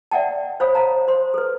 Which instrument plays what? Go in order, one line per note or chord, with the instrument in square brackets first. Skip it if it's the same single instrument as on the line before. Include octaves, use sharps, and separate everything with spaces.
[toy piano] D5 E5 F#5 G5 A5
C5 C#5 F5 B5 D#6
C5 F5 A5 A#5
C5 C6
A4 B4